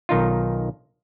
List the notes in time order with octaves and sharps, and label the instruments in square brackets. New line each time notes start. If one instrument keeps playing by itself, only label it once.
[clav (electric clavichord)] B1 D#3 D#4 F4